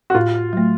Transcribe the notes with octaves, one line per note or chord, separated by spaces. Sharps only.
F#4
A2 F4
F#3 A3